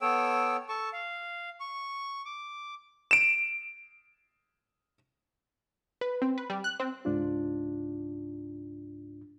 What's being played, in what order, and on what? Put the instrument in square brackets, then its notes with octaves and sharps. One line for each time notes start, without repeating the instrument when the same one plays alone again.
[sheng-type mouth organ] B3 A4 C#5 G5 E6
A4 A5 C#6
F5
C#6
D6
[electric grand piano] D7 E7
[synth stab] B4
C4
B4
G3
F#6
C4
[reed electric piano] C#2 G#2 D4 F4